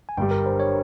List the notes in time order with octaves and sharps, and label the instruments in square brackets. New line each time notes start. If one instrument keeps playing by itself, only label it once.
[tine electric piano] G#5
[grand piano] G1 G2 G3 [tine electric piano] G5
[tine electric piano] A#4
C5
C#5